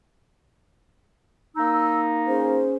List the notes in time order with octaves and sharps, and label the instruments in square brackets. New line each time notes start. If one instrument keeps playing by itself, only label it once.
[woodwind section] A#3 D#4 [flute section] E6
[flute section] C#4 G#4 C5